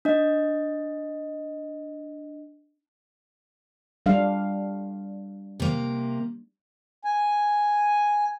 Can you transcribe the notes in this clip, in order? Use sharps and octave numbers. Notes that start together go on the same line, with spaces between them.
D4 D#5
G3 D4 F5
C3 A#3
G#5